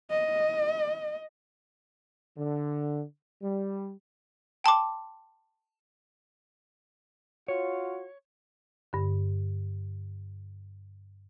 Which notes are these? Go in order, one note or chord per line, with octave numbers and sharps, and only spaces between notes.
D#5
D3
G3
G5 A5 C6 D6
F4 F#4 C#5
G2 D3